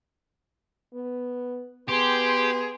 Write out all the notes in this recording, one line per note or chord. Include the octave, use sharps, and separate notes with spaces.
B3
B3 G4 G#4 C6